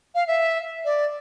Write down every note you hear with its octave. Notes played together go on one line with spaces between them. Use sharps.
F5
E5
D5